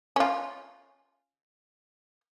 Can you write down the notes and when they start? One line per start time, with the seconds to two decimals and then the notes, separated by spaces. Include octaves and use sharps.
0.16 C#4 F4